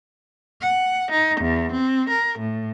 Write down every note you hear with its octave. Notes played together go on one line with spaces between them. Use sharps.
F#5
D#4
E2
C4
A#4
A2